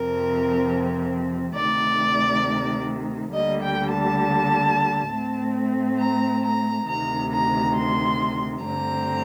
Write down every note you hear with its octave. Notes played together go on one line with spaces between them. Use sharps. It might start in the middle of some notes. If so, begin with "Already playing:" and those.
Already playing: F2 C3 F3 C4 A#4
D2 C3 D#3 A3 D5
D2 D3 G3 A#3 D#5
G5
A5
A2 A3 C4
A#5
A#5
D2 C3 D#3 A#5
A#5
C6
G2 D3 A3 C4 A#5